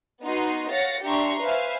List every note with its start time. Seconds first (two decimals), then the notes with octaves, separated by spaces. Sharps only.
0.22 B3 D#4 F#4 C6
0.71 C#5 F5 F#5 A6 A#6 C#7
1.04 D4 G4 E5 A#5 C6 C#6
1.42 B4 C5 E5 F5 G#5